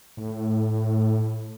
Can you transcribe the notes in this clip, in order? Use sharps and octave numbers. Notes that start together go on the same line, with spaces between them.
A2